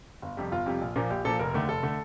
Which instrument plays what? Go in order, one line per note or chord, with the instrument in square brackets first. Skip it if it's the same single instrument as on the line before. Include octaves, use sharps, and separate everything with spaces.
[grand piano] G1
F2 C3 G3
G1 F4
F2 C3 G3
A#1
A#2 F3 A#3
A#1 G4
A#2 F3 A#3 A4
F1 A#4
D#2 D3 A3
F1 A4
D3 A3